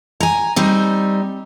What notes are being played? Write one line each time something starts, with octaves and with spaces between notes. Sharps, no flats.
G#5 A#5
G3 C4 D#4